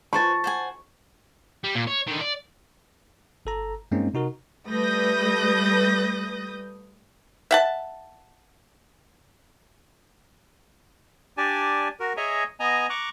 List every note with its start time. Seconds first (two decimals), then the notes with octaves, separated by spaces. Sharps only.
0.13 B4 C5 G#5 A5 C#6 A6
0.44 C5 F#5 G#5
1.64 G3
1.75 A#2
1.87 C#5
2.07 D3 D#3
2.21 D5
3.45 G1 A4 A#5
3.91 G2 G#3 A#3 C4 C#4 D#4
4.14 C3 D#4 F#4 A#4
4.68 G3 A3 B4 D#6 G6 A#6
7.51 E5 F#5 A5
11.37 D4 G4 D5 G#5 A5
12.00 F#4 A#4
12.17 G#4 C#5 D#5 E5 G#5 A#5
12.60 B3 D#5 G#5 A#5
12.90 A#5 C#6 D6 F#6